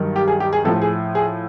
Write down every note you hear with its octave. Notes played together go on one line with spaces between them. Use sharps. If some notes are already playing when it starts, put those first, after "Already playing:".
Already playing: G2 D#3 F#3
G4
G#4
G4
G#4
A2 F3 A4
G#4
G#4